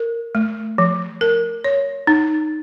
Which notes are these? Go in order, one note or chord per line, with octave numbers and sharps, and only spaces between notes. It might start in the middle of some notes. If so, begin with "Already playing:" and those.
Already playing: A#4
A3
F3
A#4
C#5
D#4